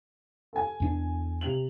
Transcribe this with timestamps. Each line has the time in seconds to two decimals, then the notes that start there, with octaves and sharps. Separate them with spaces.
0.53 A4 G#5
0.80 E2 D4
1.41 C3 F7 F#7